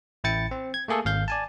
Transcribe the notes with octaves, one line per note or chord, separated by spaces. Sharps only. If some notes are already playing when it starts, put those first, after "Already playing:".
A1 E4 G5 A6 C#7
C4
G#6
A3 A#3 G#4 A4
G#1 F5 G6
D5 G#5 A5